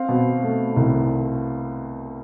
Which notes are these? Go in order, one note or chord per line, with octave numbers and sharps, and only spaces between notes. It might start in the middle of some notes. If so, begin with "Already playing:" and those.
Already playing: C4 F5
B2
A3
C2